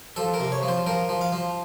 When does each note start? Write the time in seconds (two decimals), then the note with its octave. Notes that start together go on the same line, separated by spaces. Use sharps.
0.16 F3 A4
0.34 A#4
0.40 C3
0.52 C#5
0.63 F3
0.68 C5
0.86 F3 A#4
1.09 F3
1.21 F5
1.32 F3